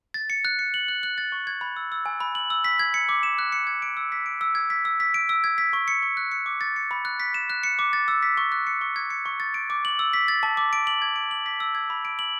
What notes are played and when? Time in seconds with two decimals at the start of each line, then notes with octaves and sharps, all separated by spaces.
0.14 A6
0.30 C#7
0.45 F#6
0.59 C#7
0.74 F#7
0.88 F#6
1.03 F#6
1.18 A6
1.32 C#6
1.47 G#6
1.61 B5
1.76 E6
1.92 E6
2.06 G#5
2.20 B5
2.35 F#7
2.50 E6
2.64 B6
2.79 G#6
2.94 C#7
3.09 D6
3.23 E7
3.39 F#6
3.52 C#7
3.67 G#6
3.82 D7
3.97 E6
4.12 B6
4.26 D7
4.41 E6
4.55 G#6
4.70 B6
4.85 E6
5.00 B6
5.14 D7
5.29 E6
5.44 G#6
5.58 B6
5.73 C#6
5.88 C#7
6.03 C#6
6.17 F#6
6.32 C#7
6.46 D6
6.61 A6
6.76 C#7
6.91 B5
7.05 F#6
7.20 B6
7.34 E7
7.50 F#6
7.63 C#7
7.79 D6
7.93 A6
8.08 E6
8.23 B6
8.38 C#6
8.52 F#6
8.67 C#7
8.81 C#6
8.96 G#6
9.10 C#7
9.26 C#6
9.40 A6
9.54 D7
9.70 D6
9.85 F#7
9.99 E6
10.13 B6
10.28 A6
10.43 A5
10.57 D6
10.73 D7
10.87 F#7
11.02 G#6
11.16 D7
11.31 F#7
11.46 B6
11.60 E6
11.75 G#6
11.90 B5
12.05 D7
12.19 F#7